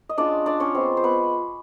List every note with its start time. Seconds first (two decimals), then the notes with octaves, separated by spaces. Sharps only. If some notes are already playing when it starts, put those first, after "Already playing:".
0.09 D#5
0.18 G#3 C#4 D4 F4 D5
0.46 D4 D5
0.60 C#4 C#5
0.74 F3 G#3 B3 C4 C5
0.97 C5
1.04 B3 B4